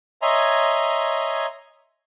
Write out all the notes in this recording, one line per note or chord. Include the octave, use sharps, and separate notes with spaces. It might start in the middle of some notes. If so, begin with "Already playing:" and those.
C#5 D#5 E5 G#5 A#5 C6